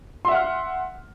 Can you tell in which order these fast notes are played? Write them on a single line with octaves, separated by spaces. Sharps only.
C6 E5 F#5 F6